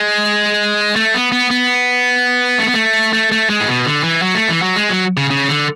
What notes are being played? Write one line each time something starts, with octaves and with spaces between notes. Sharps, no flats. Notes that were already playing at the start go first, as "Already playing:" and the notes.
Already playing: G#3
A3
B3
B3
B3
A3
B3
A3
A3
A3
G#3
A2
B2
D3
E3
F#3
A3
E3
F#3
G#3
F#3
C#3
C#3
D3